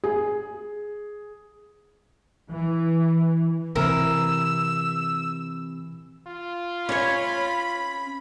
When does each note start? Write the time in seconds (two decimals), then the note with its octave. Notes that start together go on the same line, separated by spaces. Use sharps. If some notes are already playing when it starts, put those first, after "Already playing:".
0.04 G#4
2.50 E3
3.76 C3 E3 A#4 E6
6.27 F4
6.89 C#4 C#5 B5